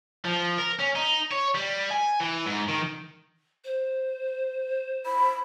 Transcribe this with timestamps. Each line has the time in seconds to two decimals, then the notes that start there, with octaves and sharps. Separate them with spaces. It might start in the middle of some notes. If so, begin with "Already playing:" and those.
0.25 F3
0.58 A#4
0.79 C#4
0.96 D#4
1.31 C#5
1.55 G3
1.91 G#5
2.21 E3
2.46 G#2
2.68 D#3
3.65 C5
5.06 B5